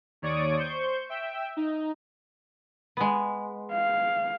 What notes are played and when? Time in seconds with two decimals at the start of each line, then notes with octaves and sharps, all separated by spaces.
0.22 D#2 C#5 D5 C#6 D#6 D7
0.58 C5 C#6 G6
1.09 E5 G5 E6
1.57 D#4
2.97 G#3 B3
3.73 F5